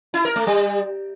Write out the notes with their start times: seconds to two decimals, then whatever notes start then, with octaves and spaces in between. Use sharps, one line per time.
0.14 E4
0.25 A#4
0.36 A3
0.47 G3